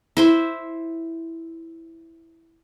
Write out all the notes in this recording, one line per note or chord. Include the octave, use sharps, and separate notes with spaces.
E4 C5 E5